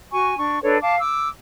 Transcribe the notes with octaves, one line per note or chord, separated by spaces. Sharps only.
F#4 G#5 C#6
D4 C#6
D4 A4 B4 C#5
F5 A5 D6
D6 E6